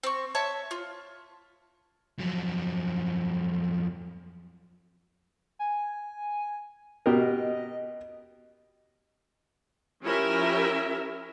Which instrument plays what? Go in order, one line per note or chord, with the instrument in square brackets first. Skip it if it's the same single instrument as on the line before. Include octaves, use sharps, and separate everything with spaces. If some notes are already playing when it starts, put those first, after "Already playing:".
[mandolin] C4 C#6
C#5 E5 A5
F4
[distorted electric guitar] F2 F#3
[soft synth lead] G#5
[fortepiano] B2 G4 A#4 [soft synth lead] D#5
[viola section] F3 C#4 E4 G4 A#4 E5